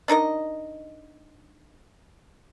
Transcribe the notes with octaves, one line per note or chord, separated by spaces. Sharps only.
D4 D#4 A#4 D#5